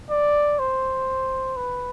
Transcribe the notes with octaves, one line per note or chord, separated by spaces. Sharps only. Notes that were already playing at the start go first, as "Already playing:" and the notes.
D5
C5
B4